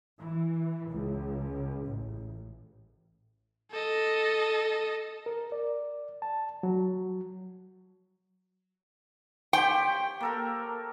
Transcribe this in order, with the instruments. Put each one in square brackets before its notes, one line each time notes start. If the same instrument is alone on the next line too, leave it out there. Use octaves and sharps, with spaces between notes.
[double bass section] E3
C#2
A1
[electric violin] A4 D#5
[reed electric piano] A#4
D5
A5
F#3
[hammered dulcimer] G4 C5 C#5 [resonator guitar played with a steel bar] G5
[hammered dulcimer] A#3 A4 A#4